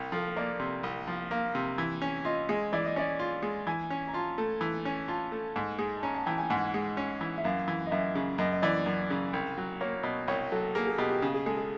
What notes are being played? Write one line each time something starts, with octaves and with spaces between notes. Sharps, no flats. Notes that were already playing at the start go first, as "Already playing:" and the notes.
Already playing: C2
F3 A4
A#3 D5
C3
C2
F3
A#3 F5
C3
E3
C#4
F4 D#5
G#3 D#5
E3 D5
D#5
C#4 D5
F4
G#3
E3 G#5
C#4
A#5
F4 A5
A3
E3
C#4
F4 A5
A3
G#2
G#3
A5
C#4 A#5
A5
E3 G5
G#5
G#2 F#5
G#3
C#4
E3
E5
F#2 F5
E3
D#5
F#2 E5
C#3
F#2 D#5
D#5
E3 D5
F#2
C#3
C2
F#3
A#3 C#5
B2
C2 C#5
F#3 A4
A#3 G#4
G#4
B2 G4
G4
C#3 G#4
G#4
G#3 A4
G#4